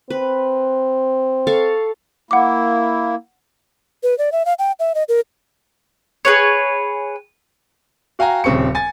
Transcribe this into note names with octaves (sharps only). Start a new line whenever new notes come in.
C4 B4
A4 F5 C#6
A#3 E4 F#5 D6
B4
D5
E5
F5
G5
E5
D#5
A#4
G#4 B4 C#5
F#4 F5 G5 G#5 A#5
D#1 C#3 C4 C#6 C#7
G#5 A6